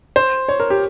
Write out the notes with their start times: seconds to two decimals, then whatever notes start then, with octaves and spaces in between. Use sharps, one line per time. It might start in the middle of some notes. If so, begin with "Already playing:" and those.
0.16 C5
0.48 C#5
0.60 A#4
0.70 G4